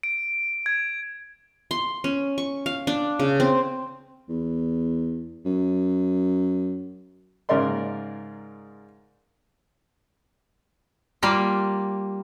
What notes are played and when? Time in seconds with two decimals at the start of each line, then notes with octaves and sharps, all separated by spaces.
0.03 D7
0.66 G#6
1.71 C6
2.04 C#4
2.38 C#6
2.66 F5
2.87 D4
3.19 C#3
3.40 C4
4.29 E2
5.45 F#2
7.49 G#2 C#3 A#4 D5 C6
11.22 G3 A#3 F4